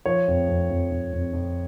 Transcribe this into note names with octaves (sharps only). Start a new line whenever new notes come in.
F3 C#5
F2
F2
F2
F2
F2
F2